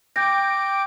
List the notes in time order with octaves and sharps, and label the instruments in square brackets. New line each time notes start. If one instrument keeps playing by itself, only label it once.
[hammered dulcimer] G5 [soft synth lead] D6 [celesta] G6 A#6